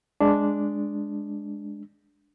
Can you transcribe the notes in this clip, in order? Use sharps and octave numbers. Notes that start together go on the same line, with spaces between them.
G#3 D4